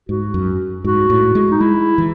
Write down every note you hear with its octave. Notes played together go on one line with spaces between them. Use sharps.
G#2 F#4
F#2
G#2 F#4
A2
G#3
D#4
G#3 E4
E3